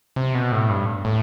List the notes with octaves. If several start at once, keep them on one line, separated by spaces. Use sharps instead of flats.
C3
B2
A2
G2
A2